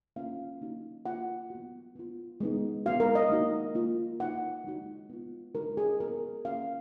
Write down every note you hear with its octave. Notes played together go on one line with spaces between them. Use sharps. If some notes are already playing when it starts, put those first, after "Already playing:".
A#3 C#4 F4 F5
A#3 D#4 F#4
A#3 F4 F#5
B3 F#4
B3 F4
G#3 B3 D#4
G#3 B3 F#4 F5
A#4
D#5
A#3 D#4 F#4
A#3 F4
A#3 D#4 F#4 F#5
G#3 D#4 F#4
B3 F4
G#3 D#4 F#4 A#4
G#4
B3 F#4 A#4
A#3 C#4 F#4 F5